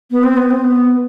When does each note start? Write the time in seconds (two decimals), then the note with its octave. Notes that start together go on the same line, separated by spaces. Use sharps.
0.11 B3
0.23 C4
0.36 B3
0.50 C4
0.64 B3